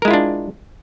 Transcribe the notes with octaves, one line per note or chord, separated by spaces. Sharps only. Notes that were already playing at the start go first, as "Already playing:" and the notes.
G#3 D4 E4 F4 A#4